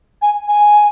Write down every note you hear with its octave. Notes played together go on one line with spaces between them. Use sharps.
G#5
G#5